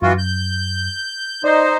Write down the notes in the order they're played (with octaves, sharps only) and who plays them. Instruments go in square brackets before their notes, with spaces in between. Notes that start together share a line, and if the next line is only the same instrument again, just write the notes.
[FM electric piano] F#2 [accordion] E3 F4 F#4
[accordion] G6
[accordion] D#4 C5 [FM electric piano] D5 G6